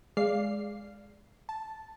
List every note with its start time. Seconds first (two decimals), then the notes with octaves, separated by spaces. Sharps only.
0.17 G#3 D5 F5 C7
1.49 A5